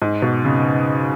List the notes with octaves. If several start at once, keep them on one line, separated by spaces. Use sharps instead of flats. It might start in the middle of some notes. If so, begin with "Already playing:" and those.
G#2
B2
C#3